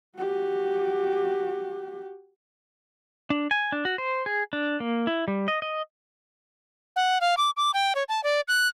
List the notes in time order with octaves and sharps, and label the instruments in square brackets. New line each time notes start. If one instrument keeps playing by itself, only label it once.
[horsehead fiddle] F#4 G4
[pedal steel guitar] D4
G#5
D4
F#4
C5
G#4
D4
A#3
E4
G3
D#5
D#5
[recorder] F#5
F5
D6
D6
G5
C#5
A5
D5
F#6